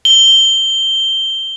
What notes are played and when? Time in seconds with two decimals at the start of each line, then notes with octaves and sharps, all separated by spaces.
0.05 G7